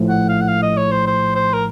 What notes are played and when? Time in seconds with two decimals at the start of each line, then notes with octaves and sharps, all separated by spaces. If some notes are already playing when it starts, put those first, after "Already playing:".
Already playing: A#1 A2 F3 A3
0.09 F#5
0.29 F5
0.41 F#5
0.48 F5
0.62 D#5
0.77 C#5
0.91 C5
1.07 C5
1.36 C5
1.54 A#4